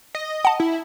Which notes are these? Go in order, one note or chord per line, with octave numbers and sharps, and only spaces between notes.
D#5
F#5 A5
E4